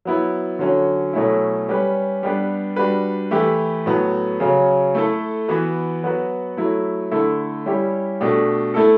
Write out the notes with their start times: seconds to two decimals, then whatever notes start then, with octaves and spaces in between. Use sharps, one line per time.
0.05 F#3 B3 E4
0.59 D3 F#3 C#4
1.13 B2 F#3 A3 C#4 E4
1.68 G3 C#4 G4 B4
2.23 G3 B3 D4 G4 B4
2.76 G3 D4 F#4 B4
3.31 E3 A3 E4 G4 B4
3.86 A2 F#3 B3
4.40 C#3 F#3 C#4
4.95 A3 E4 A4
5.48 E3 B3 F#4 B4
6.03 F#3 B3 F#4 B4
6.57 F#3 A3 E4
7.11 D3 A3 E4 A4
7.66 G3 C#4 E4 G4
8.20 B2 A3 D4 G4
8.74 A3 E4 A4